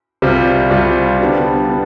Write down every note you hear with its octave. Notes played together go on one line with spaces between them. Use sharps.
C2 C3 G3 C4 F4
C2 C3 G3 C4 F4
D3 G3 B3 D4
D3 B3